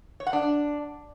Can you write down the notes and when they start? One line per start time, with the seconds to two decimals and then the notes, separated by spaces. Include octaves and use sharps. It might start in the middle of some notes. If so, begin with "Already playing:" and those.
0.20 C#5
0.27 F#5
0.33 D4